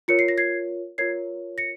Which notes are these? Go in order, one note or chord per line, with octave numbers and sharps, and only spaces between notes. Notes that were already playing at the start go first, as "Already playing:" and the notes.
F4 A#4 C#5 C#7
C7
A#6
G#6 C7
F4 A#4 C#5 G#6 C7
A#6 C#7